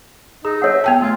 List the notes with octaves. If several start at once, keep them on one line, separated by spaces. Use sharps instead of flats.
D#4 G#4
A4 C#5 E5 F#5
B3 G5 A5
A3 F4